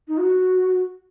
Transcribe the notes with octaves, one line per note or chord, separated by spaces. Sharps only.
D#4
F#4